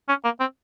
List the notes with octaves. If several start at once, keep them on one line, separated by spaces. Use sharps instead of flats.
C#4
A#3
C4